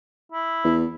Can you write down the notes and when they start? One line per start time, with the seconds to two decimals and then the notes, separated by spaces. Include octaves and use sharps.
0.32 E4
0.64 E2